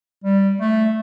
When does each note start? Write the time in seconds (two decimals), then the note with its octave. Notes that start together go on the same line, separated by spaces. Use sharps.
0.24 G3
0.60 A3